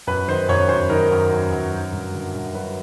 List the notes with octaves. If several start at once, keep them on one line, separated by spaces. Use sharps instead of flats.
F#2 B4
D#3 C5
F#2 C#5
F#2 C5
D#3 A#4
F#2
F#2
F#2
F#3
G2
D3
G2
F#3 B4